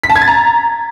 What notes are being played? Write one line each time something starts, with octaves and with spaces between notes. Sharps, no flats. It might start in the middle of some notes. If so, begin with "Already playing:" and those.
B6
A5
G#6
A6
A#5